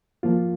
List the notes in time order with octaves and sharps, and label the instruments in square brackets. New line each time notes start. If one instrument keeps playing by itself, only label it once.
[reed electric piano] F3 A#3 F4